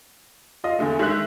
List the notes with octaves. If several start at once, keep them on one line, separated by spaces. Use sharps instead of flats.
F4 D#5
E2 D3 A3
D#3 G#3 E5 F#6